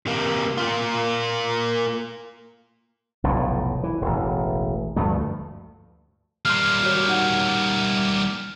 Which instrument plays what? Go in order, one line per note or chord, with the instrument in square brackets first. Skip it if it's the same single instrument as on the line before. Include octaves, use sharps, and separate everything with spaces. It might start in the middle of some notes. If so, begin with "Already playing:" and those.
[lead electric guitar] C3 A#3
A#3 F4
[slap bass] F1 B1 A2
E3
E1 A1
D2 G2 F3 A3
[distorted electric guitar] G3 A#3 [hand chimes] C6 G6 C7 [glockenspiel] F6
[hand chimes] F#4 C#5
D#4 F#5 G6